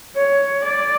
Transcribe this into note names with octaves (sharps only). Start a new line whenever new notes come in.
C#5
D5